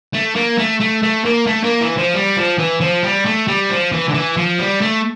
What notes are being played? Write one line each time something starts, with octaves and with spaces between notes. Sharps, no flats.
A3
A#3
A3
A3
A3
A#3
A3
A#3
E3
F3
G3
F3
E3
F3
G3
A3
G3
F3
E3
D3
E3
F3
G3
A3